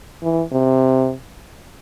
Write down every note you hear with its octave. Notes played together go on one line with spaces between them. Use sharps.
E3
C3